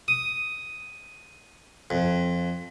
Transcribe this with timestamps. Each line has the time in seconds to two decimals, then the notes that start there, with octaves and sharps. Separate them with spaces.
0.08 D#6
1.90 F2